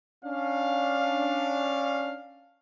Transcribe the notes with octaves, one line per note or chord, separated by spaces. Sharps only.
C#4 D4 F5